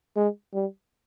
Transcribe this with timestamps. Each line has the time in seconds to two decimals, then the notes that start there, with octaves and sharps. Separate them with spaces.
0.16 G#3
0.54 G3